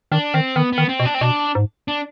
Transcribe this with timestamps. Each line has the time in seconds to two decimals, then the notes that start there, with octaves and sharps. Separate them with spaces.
0.12 D#3 D4
0.34 D#3 C4
0.56 D#3 B3
0.73 B3
0.78 D#3
0.89 C4
1.00 B2
1.05 D4
1.14 C4
1.21 B2 D4
1.55 G#2
1.88 D4